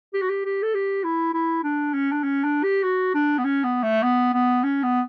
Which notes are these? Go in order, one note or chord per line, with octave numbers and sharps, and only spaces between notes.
G4
F#4
G4
G4
A4
G4
E4
E4
D4
C#4
D4
C#4
D4
G4
F#4
D4
B3
C#4
B3
A3
B3
B3
C#4
B3